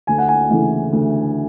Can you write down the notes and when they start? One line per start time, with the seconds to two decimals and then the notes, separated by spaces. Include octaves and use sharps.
0.07 D2 G#5
0.18 F#5
0.28 G#5
0.50 C#3 E3 A3
0.92 D2